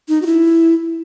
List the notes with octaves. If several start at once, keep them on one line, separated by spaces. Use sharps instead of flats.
D#4
F#4
E4